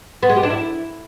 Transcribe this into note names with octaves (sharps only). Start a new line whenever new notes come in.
B3
G#3
G4
D4
E4